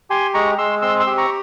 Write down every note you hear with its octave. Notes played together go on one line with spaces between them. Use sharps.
G4 G#5 C6
G#3 A#5 C#6
G#3 C6 E6
C4 C6 E6
C6 E6
G4
A#5 C#6